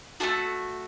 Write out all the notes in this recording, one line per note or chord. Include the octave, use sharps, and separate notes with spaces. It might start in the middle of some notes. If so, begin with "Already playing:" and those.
A3 D4 F#4 A4